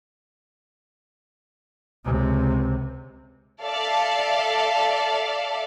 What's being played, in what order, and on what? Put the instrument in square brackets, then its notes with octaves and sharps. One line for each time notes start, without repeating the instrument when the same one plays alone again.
[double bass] C#2 C3
[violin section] A4 D5 E5 F5 A5